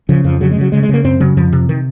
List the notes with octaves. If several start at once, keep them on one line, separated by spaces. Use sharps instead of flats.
C#3 F3
F2 F3
C#3 F#3
G#3
C#3 F#3
C#3 G#3
G#3
C#3 A#3
F#2 C4
C#3 F#3
F2 F3
C3
D#3